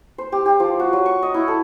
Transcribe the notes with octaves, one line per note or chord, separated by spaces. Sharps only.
C5
G4
G4
F3
F#4
F#3
C#6
D#5
E4
A4